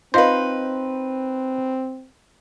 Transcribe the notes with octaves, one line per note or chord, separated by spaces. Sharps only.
C4 D#4 F4 B4 C5 D#5 F5